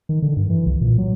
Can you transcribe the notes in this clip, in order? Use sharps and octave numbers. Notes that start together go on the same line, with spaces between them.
D#3
D3
G2
E3
C2
A#2
F#3